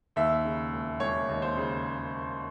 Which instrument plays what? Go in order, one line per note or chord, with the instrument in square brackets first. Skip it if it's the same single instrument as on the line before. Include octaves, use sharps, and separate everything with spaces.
[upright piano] D#2 [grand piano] E5
[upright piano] C#3
E1
[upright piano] E1 [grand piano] C#5
[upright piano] D#2
[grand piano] C5
[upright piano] C#3